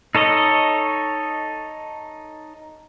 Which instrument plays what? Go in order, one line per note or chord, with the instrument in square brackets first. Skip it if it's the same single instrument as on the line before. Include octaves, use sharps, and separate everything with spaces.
[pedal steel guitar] D#4 A4 C#5 D#5